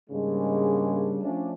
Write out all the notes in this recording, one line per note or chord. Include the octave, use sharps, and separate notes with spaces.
G#2 C#3 G3 G#3 A#3 D4
F3 A3 C#4 D4